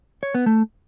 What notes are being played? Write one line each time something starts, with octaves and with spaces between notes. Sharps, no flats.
C#5
B3
A3